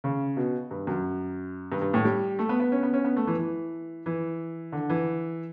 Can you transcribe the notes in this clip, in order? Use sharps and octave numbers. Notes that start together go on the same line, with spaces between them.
C#3
B2
G2
F#2
G2
G2
A2
G3
A3
B3
B3
C#4
B3
C#4
B3
A3
E3
E3
E3
D3
E3